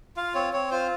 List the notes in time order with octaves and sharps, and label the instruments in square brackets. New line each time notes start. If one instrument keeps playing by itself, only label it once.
[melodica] F4 F5
C4 C#5
C4 C#5
F4 C5